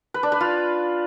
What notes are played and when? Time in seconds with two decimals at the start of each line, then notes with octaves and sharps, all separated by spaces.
0.14 B4
0.23 D4
0.32 B4
0.41 F4